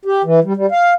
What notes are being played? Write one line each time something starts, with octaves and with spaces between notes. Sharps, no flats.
G4
E3
G3
G3
F5